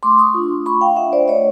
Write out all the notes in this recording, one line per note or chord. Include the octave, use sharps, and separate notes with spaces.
A3 C6 D6
C#6 D#6
D4 F4
A3 B5 C#6
F5 G5
D4 F4 E5 F#5
C5 D5
A3 C#5 D#5